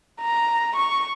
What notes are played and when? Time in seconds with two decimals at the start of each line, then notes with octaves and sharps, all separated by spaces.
0.22 A#5
0.76 C#6